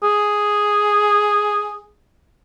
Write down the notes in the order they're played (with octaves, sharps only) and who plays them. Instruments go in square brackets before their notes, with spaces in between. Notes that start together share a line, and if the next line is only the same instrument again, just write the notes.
[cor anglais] G#4